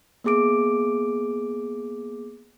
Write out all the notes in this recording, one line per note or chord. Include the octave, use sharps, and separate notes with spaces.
A#3 B3 G#4 D6 D7